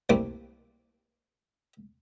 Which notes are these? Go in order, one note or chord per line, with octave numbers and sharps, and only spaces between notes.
C2 G3 A3 A#3 C4 D6